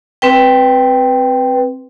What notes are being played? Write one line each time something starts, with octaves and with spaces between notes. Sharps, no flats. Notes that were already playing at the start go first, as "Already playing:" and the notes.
C4 B4 G5